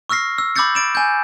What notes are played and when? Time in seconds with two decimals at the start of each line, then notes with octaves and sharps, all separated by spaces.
0.09 C#6 E6 F6 A#6 C7
0.38 E6
0.56 B5 D6 E6 G6 A6 C#7
0.75 A6 D7 E7
0.95 G#5 G6